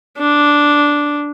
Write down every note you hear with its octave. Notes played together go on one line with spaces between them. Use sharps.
D4